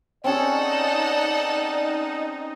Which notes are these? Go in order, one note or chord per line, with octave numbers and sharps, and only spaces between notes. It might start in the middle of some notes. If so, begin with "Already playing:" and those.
C4 C#4 D#4 G#4 A4 D5 F#5